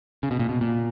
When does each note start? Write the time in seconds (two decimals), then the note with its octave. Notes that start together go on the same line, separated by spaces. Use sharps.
0.23 C#3
0.31 B2
0.40 A#2
0.49 B2
0.61 A#2